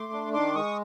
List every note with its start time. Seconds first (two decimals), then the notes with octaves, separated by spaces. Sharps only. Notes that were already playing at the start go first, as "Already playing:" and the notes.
Already playing: A3 C6 D6
0.12 D4
0.33 D#3 C6 D6
0.55 G#3 C#6 D#6